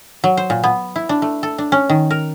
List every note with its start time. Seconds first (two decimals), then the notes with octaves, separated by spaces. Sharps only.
0.24 F#3
0.37 C5
0.50 A#2
0.64 B3
0.96 E4
1.09 D4
1.22 A3
1.43 A4
1.58 D4
1.72 C#4
1.89 D#3
2.11 A#4